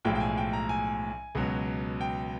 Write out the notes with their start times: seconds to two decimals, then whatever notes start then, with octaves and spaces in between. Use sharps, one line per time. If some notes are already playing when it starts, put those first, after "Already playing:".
0.05 B1 A2 F3 G#3 G5
0.15 G5
0.20 G#5
0.37 G5
0.53 A#5
0.69 G#5
1.35 C#2 B2 F#3
2.01 G5